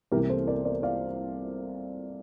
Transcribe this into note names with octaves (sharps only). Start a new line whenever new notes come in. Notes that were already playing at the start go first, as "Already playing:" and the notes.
C2 C3 E3 A#3 G4 A#4
A4 C5
A#4 D5
A#4 D5
D5 F5